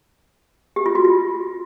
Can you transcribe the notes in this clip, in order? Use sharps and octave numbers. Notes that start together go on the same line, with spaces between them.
G4
F4
F#4
F4